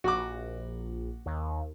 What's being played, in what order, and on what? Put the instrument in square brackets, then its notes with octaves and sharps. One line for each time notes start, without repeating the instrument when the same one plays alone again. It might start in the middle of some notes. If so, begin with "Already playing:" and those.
[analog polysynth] A#1 [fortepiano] F#4 D6
[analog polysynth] D#2